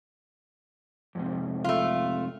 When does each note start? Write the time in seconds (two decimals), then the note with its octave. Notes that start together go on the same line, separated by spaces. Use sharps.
1.15 F2 G#2 C3
1.64 A3 F4